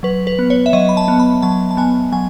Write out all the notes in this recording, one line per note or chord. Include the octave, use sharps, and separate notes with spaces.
F#3 B4
B4
B3
C#5
E5
F#3 D#5
B5
A5
B3
B5
F#3 A5
A5
B3 G#5
F#3 G#5